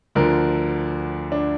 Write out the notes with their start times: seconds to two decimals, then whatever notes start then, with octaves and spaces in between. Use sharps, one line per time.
0.15 D2 D3 F3 A#4
1.32 D4